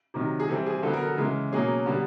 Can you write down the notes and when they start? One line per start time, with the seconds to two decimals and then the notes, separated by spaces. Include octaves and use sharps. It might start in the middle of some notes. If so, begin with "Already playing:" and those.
0.14 C3 D#3 F#3
0.40 G#4
0.48 E3 G3 C4 A4
0.66 G#4
0.82 D3 F#3 B3 A4
0.93 A#4
1.05 A4
1.17 C#3 E3 G#3
1.52 B2 F#3 A#3 C#4 G#4
1.86 D3 G3 B3